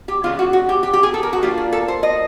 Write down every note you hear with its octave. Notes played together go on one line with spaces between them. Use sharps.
G4
C#3 E3 G#3 B3 F4
F#4
F#4
G4
G4
G4
G#4
A4
A#4
F#4
A#2 F3 A#3 D4 F4 G4
G#4
A4
C5
D#5